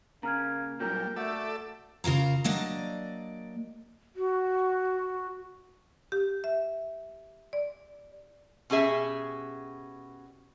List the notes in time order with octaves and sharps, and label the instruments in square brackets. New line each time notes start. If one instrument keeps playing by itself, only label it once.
[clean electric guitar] C#3 [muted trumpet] A#3 [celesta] A#5 F6 G#6
[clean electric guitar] A#2 F#3 [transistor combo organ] G3 [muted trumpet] A#4 [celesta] G6
[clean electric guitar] A3 [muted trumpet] F#4 [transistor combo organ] A4 D5 E5
[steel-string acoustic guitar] C#3 F4 A#4 A#5
F#3 A#3 D4 D5 D#5
[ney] F#4
[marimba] G4
E5
D5
[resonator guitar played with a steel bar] B2 C#4 G4 G#4 E5